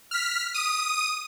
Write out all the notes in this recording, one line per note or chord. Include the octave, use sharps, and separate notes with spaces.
F6 B6
D#6 D#7